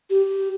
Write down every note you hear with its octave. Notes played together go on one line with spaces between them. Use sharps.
G4